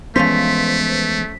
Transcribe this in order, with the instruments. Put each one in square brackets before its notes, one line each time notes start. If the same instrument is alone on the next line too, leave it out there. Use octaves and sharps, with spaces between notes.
[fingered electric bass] E3 G#3 B3 [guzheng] F3 C#4 C5 [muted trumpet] A3 [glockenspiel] B6